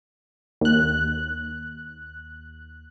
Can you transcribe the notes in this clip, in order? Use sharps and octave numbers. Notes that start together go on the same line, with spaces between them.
D#2 F#6